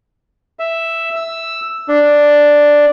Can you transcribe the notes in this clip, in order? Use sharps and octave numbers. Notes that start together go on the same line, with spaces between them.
E5
E6
D4